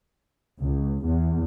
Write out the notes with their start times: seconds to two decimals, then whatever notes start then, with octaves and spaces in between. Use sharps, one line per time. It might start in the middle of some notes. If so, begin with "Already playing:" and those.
0.61 C#2
1.05 E2